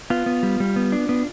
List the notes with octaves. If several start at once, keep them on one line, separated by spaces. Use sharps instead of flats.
B3 F4
B3
G3
G3
B3
D4
B3